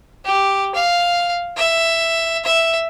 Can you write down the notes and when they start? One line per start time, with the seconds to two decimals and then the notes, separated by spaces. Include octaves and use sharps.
0.25 G4
0.75 F5
1.57 E5
2.44 E5